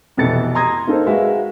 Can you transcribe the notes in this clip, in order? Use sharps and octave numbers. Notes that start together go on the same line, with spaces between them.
F1 B2 E3 A4 A6 C#7
A#5 C6 D#6 G#6 A#6
A#3 D#4 A4 C5
G#3 F#4 B4 E5 F5